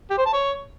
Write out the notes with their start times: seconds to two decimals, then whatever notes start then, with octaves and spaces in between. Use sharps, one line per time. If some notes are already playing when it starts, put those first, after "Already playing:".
0.10 G4
0.18 C5
0.26 A5
0.33 C#5